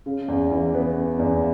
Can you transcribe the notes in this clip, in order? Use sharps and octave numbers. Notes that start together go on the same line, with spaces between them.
C#3
E2
E3
B3
C#3
E2